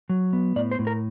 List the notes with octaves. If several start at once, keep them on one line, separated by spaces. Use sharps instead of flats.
F#3
B3
A2 D5
C5
A2
A#4